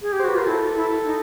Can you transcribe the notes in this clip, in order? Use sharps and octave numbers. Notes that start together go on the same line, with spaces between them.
G#4
G4
C5
F#4 B4
F4 A#4
E4 A4
E4
D#4